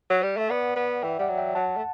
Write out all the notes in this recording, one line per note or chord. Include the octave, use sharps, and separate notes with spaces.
F#3
G3
A3 E5
B3 D5 F#5
B3
E3 E5 G5
G3 D5 F#5
F#3
E5 G5
F#3 F#5 A5
A3